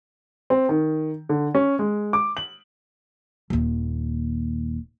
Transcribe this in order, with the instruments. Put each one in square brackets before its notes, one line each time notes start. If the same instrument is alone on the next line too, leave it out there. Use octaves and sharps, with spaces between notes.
[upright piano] C4
D#3
D3
C#4
G#3
D6
F#7
[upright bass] D#1 D#2